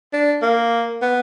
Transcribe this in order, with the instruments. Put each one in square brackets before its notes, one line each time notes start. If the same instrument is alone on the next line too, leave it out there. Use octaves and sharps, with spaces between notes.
[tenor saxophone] D4
A#3
B3